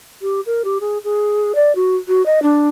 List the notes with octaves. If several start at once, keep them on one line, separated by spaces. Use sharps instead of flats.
G4
A#4
G4
G#4
G#4
D5
F#4
F#4
D#5
D4